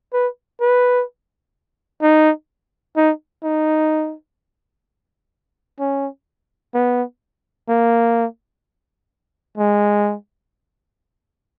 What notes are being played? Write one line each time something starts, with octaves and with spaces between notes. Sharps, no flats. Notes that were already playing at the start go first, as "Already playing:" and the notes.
B4
B4
D#4
D#4
D#4
C#4
B3
A#3
G#3